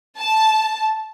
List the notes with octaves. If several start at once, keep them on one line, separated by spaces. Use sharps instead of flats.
A5